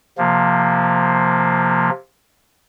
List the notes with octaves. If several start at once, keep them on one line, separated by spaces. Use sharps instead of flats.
C3 F3 A#3